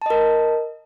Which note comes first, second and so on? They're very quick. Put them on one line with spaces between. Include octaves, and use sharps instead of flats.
A5 D#5 A#4